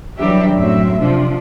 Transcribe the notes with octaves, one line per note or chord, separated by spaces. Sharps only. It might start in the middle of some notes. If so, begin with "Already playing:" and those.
E3 F#3 G3 D4 G4 E5
F#2 A2 F#3 C4 E5
C3 F3 D4